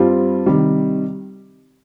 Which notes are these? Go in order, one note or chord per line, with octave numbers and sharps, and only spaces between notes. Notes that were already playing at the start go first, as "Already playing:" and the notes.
Already playing: G2 G3 C4 F4
C3 D#3 G3